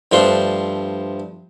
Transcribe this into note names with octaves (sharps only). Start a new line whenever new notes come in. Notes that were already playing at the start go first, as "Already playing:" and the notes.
G2 F3 A3 D4 C5 C6